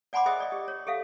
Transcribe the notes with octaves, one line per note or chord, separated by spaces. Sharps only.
D5 F#5 G#5 B5 C6 D6
G#4 C5 D#5 E5 G5 D#6
D5 D#5
G4
C#5
G4 A4 E5 F5